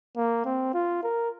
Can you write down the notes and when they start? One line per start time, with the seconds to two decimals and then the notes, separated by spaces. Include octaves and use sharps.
0.17 A#3
0.45 C4
0.74 F4
1.03 A#4